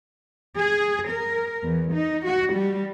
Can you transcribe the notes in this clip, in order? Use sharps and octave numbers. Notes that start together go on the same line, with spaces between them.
G#4
A#4
E2
D#4
F#4
G3